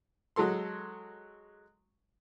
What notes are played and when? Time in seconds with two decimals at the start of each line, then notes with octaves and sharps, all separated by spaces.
0.36 F#3 G#3 A4 C6